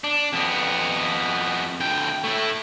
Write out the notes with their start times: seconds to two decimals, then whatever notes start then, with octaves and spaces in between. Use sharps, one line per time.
0.04 D4
0.33 F2 B3
1.80 D2 G5
2.24 A3 E4